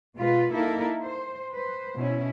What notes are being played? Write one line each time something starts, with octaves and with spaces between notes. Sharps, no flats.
B2 G#3 F4 B4
A#3 D#4 E4 A4 A#4
C5
B4 C5
B2 C#4 E4